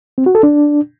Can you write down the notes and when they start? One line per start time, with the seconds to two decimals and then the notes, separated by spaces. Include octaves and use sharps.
0.18 C4
0.26 F#4
0.35 A4
0.43 D4